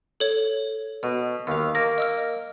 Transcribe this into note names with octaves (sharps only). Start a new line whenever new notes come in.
A4 C#5
B2
D#2 F5
A#3 A#6
D#5 E6 F6